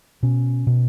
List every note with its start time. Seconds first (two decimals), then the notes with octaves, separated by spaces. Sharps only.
0.23 B2 C#4
0.67 B2